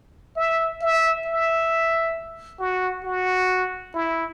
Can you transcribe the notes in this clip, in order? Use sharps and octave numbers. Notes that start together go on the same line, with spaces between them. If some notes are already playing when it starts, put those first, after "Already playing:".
E5
E5
E5
F#4
F#4
E4